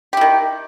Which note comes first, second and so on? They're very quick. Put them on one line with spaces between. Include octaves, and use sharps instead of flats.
G4 E4 D#3